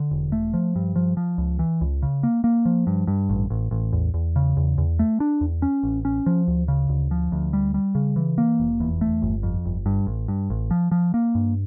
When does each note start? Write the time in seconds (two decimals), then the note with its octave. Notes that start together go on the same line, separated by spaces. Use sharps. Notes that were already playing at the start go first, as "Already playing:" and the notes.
Already playing: D3
0.11 E1
0.32 A3
0.54 F3
0.76 G2
0.96 F3
1.17 F3
1.38 C#2
1.59 E3
1.81 C#2
2.02 C#3
2.23 A#3
2.44 A#3
2.65 F3
2.87 G2
3.07 G2
3.29 A1
3.50 A1
3.71 A1
3.93 E2
4.14 E2
4.36 C#3
4.57 E2
4.78 E2
4.99 A3
5.20 D4
5.41 E2
5.62 C#4
5.83 A1
6.05 C#4
6.26 F3
6.48 D2
6.68 C#3
6.89 D2
7.11 F3
7.32 D2
7.53 G3
7.74 G3
7.95 C#3
8.16 E3
8.38 A#3
8.60 F1
8.80 E2
9.01 A3
9.22 G1
9.43 F2
9.65 G1
9.86 G2
10.07 A1
10.28 G2
10.50 A1
10.71 F3
10.92 F3
11.14 A#3
11.35 G2